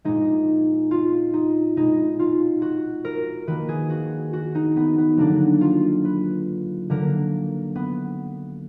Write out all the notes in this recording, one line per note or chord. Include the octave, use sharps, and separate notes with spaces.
A#2 G#3 D#4
F4
D#4
B2 G#3 D#4
F4
F#4
A#4
D#3 A#3 B4
G#4
F#4
F#4
D#4
B3
B3
D3 F#3 A#3 D4
F4
B4
D3 F#3 A#3 A#4
B3